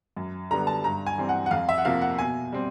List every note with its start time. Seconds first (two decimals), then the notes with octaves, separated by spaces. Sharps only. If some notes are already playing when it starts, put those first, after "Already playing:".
0.17 F#2
0.51 D3 G3 B3 A#5
0.67 A5
0.84 G2 A#5
1.07 G#5
1.18 E3 G3 C4
1.29 F#5
1.46 F#5
1.51 F2 F5
1.69 E5
1.78 F#5
1.85 C3 F3 A#3 F5
2.02 F#5
2.18 B2 G#5
2.52 G3 C4